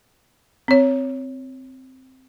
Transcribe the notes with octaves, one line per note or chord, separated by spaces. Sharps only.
C4 C#5